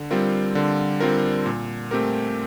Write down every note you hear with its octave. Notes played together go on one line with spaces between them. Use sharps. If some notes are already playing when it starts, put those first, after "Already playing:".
Already playing: D3
G3 C4 F4 A#4
D3
G3 C4 F4 A#4
A#2
A3 C4 G4 A#4